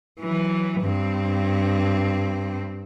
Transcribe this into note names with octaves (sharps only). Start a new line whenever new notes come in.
E3 F#3
G2 C4